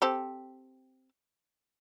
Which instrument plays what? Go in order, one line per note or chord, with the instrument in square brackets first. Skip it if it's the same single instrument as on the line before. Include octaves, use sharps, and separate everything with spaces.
[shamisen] C4 G4 A4